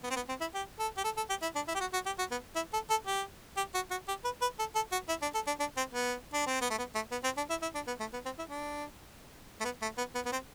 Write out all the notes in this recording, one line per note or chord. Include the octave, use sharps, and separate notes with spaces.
B3
C4
B3
C4
E4
G4
A4
G4
A4
A4
G4
E4
D4
E4
G4
F#4
F#4
G4
F#4
B3
E4
A4
A4
G4
G4
F#4
F#4
G4
B4
B4
A4
A4
F#4
E4
D4
A4
D4
D4
C4
B3
D4
C4
B3
A3
B3
A3
B3
C4
D4
E4
E4
D4
B3
A3
B3
C4
E4
D4
A3
B3
A3
B3
B3
B3
C4